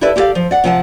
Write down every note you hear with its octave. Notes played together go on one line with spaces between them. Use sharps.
E4 G4 A4 B4 D5 E5
E4 G4 A4 B4 D5 F5
F3
D5 F#5
C3 F3 F#5 G#5 A5